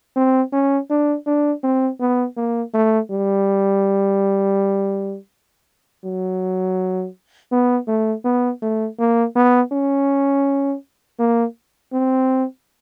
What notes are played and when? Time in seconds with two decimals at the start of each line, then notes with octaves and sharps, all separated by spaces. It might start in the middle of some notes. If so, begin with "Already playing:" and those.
0.16 C4
0.53 C#4
0.90 D4
1.27 D4
1.63 C4
2.00 B3
2.37 A#3
2.74 A3
3.11 G3
6.05 F#3
7.52 B3
7.88 A3
8.25 B3
8.62 A3
8.99 A#3
9.36 B3
9.72 C#4
11.19 A#3
11.92 C4